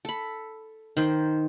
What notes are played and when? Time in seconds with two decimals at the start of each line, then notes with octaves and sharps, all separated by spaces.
0.05 A4 B5
0.97 D#3 C5